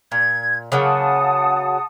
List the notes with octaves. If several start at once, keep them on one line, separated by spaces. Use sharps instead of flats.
A#2 G#6
C#3 F#3 A#3 F#5 A5 D#6